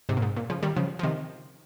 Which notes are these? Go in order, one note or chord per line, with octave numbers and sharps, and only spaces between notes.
G#2 C3
A#2
G#2
A#2
C#3 F3
D#3 G3
C#3 F3
F3
C3 D#3